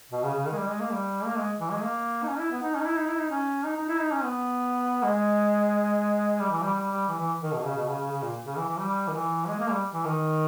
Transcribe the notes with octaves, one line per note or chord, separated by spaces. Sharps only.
B2
C#3
C#3
D#3
G#3
G3
G#3
A#3
G3
A#3
G#3
E3
G#3
A#3
D#4
C#4
E4
B3
D#4
C#4
D#4
E4
D#4
E4
D#4
C#4
D#4
D#4
E4
D#4
C#4
B3
G#3
G3
E3
G3
G3
G3
E3
E3
D#3
B2
C#3
B2
C#3
C#3
C#3
A#2
C#3
E3
E3
G3
D#3
E3
G#3
A#3
G3
E3
D#3